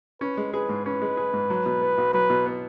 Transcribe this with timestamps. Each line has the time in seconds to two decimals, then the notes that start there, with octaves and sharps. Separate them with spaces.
0.21 C#4 B4
0.37 G#3
0.53 G#4 B4
0.69 G#2
0.86 C#4 B4
1.02 G#3
1.17 G#4
1.33 G#2
1.50 F#3
1.66 B2
1.82 B3
1.98 B1
2.13 F#3 B4
2.30 B2
2.46 B3